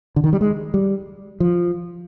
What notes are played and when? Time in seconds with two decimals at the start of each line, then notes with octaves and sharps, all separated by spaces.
0.16 D3
0.24 D#3
0.33 G3
0.41 G#3
0.74 G3
1.40 F3